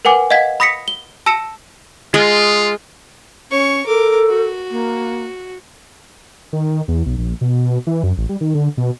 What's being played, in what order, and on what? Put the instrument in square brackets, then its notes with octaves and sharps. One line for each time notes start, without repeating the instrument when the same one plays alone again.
[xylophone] A#4 B4 F#5 G#5 D6
D#5 F5 F#5 G#6 B6
B5 D#6 A#6 B6 C#7
G7
A5 E6 A#6 C#7 E7
[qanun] G#3 [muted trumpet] F4
[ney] C#4 [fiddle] C#5 C#6
[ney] A4 [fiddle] A#4 D6
[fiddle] F#4
[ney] A#3
[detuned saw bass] D#3
E2
B1
A#1
B2
E3
F#2
A1
G3
D#3
D3
B2